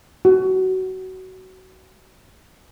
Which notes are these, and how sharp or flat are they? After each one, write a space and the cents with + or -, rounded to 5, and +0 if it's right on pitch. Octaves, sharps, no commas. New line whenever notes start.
F#4 +20